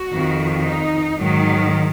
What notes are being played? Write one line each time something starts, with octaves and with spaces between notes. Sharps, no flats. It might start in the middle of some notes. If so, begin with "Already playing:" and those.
Already playing: F#4
F2 D#3
D#4
G#2 D#3 F#3